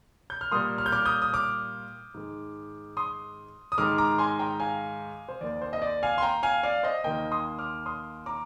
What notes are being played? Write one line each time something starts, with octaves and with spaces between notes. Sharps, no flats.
G6
F6
A#2 G3 A#3 C6 D#6
F6
G6
D6 F6
D#6 G6
D#6
D6 F6
G#2 D#3 G#3
C6 D#6
D#6
G#2 D#3 G#3 D6 F6
A#5 D6
G#5 C6
G5 A#5
F5 G#5
C5
D#2 D#3 A#3 D5
C5
D#5
D5
F5 G#5
C6
G5 A#5
F5 G#5
D5 F5
C5 D#5
D#2 D#3 A#3 D#5 G5
C6 D#6
D6 F6
C6 D#6
A#5 D6